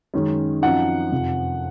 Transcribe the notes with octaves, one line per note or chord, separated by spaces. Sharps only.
F#2 D#3 G#3 C#4
F#2 F3 C4 D#4 F#5
F2 C3 F3